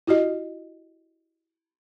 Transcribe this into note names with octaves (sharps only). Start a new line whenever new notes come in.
E4 F#4 G4 D#5